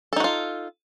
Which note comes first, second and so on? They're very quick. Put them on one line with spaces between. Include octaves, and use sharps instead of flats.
A4 D#4 F#4 F4